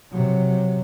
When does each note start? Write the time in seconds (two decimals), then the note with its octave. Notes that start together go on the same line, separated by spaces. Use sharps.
0.12 C3 F#3